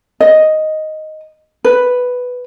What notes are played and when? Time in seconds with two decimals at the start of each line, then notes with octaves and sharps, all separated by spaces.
0.20 D#5
1.65 B4